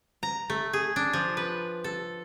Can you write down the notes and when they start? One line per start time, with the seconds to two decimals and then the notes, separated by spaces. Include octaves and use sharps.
0.23 A#5
0.50 A3
0.73 G#4
0.96 D4
1.13 F3
1.37 B4
1.84 A4